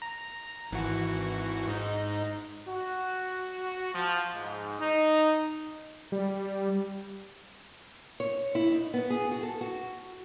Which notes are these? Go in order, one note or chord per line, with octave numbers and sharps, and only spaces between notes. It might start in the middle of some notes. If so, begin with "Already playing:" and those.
A#5
G#1 E3 F#4
G#2 D#4
F#4
F3
G#2
D#4
G3
C#5
E4
D#4
B3
G#4
F#4
A4
F#4